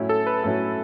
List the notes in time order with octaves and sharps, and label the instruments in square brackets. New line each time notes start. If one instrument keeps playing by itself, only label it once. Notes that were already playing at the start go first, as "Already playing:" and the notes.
Already playing: [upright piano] A2 F#3 C#4 E4
[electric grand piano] A4
B4
[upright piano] A2 F#3 C#4 E4 [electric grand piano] A4